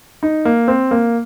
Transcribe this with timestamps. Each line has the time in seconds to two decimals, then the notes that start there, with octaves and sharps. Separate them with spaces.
0.23 D#4
0.45 A#3
0.68 C4
0.91 A#3